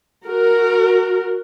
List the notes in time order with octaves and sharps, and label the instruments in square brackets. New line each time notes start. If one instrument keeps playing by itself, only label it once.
[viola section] F#4 A#4